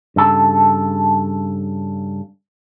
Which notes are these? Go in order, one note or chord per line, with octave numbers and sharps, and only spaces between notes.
G2 C#3 A4 A5